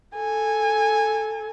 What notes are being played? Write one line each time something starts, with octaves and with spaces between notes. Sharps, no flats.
A4 G#5